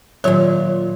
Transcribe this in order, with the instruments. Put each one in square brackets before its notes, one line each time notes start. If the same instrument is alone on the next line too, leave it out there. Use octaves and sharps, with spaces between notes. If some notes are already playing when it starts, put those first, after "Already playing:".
[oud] A#2 F4 C#5 [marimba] D#3 F#3